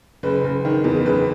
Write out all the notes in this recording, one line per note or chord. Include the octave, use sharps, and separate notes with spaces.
F#1 B4
F#1
D#3
E2
F#1 B4